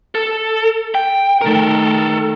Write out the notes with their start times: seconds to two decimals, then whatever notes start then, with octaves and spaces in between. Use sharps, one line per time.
0.15 A4
0.95 G5
1.41 D#3 A3 A4 A#4